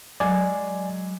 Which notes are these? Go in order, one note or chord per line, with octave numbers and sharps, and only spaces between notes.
F#3 G#3 D5 F5 G#5